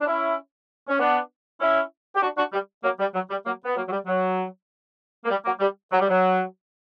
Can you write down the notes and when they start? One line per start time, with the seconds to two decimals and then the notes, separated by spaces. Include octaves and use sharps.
0.01 D4
0.06 C#4 E4
0.88 C#4
0.99 B3 D4
1.60 C#4 E4
2.14 G4
2.22 D4 F#4
2.37 D4 F#4
2.53 G3
2.83 F#3 A#3
2.99 G3
3.14 F#3
3.30 G3
3.45 F#3 A#3
3.64 B3
3.76 F#3 A#3
3.86 F#3
3.91 G3
4.06 F#3
5.25 A#3
5.29 G3
5.45 F#3 A#3
5.60 G3
5.91 F#3
6.00 G3
6.08 F#3